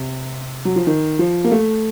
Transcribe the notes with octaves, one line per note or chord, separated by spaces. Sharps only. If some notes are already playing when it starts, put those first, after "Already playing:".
Already playing: C3
F#3
F3
D#3
F3
A#3
A3